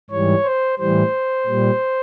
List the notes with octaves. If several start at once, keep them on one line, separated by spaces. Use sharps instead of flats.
G#2 E3 G3 C#5
C5
A2 E3 G3 C5
A#2 G3